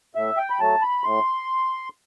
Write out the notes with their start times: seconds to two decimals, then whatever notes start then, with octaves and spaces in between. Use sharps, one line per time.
0.15 A2 E5
0.37 G5
0.50 B5
0.60 F#3 A3 A5
0.82 B5
1.04 A2 C6